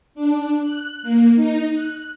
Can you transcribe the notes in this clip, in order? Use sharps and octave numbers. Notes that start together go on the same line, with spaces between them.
D4
F#6
A#3
D#4
F#6